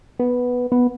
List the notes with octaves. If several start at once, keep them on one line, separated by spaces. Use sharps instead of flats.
B3
B3